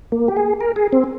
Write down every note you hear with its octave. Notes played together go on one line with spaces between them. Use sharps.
A#3
G4
G#4
A#4
G#4
C4